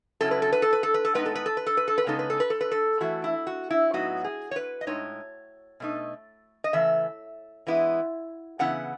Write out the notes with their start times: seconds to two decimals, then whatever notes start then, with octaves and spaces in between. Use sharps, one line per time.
0.21 C#3 F#3 C#4 E4 A4
0.31 B4
0.42 A4
0.52 B4
0.62 A4
0.73 B4
0.83 A4
0.94 B4
1.05 A4
1.14 A2 G#3 B3 D#4 B4
1.26 A4
1.35 B4
1.46 A4
1.57 B4
1.67 A4
1.77 B4
1.88 A4
1.98 B4
2.07 C#3 G#3 B3 D#4 A4
2.19 B4
2.30 A4
2.40 B4
2.50 A4
2.61 B4
2.71 A4
3.00 E3 A3 E4 F#4
3.24 E4
3.47 F#4
3.70 E4
3.93 A2 F#3 B3 D#4 F#4
4.24 G#4
4.51 C#5
4.56 B4
4.81 D#5
4.87 A2 G#3 D#4 C#5
5.80 B2 A3 D#4
6.64 D#5
6.73 C#3 E3 A3 E5
7.67 E3 G#3 B3 E4
8.59 C#3 E3 B3 E4 F#5